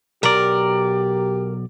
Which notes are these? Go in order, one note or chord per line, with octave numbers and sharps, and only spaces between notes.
B1 G4 A#4 D5